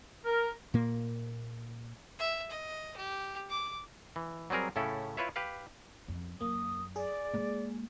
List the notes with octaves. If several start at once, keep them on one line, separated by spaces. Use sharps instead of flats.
A#4
A#2 A#3
E5
D#5
G4
D6
E3
F#3 G3 C4 G#4 A#4
A2 C#3 A3 C#4 E4 A4
E4 F4 B4 C#5 E5
G4 B4 F5
F2
F#2 A#3 D#6
G#4 D5
G#3 A#3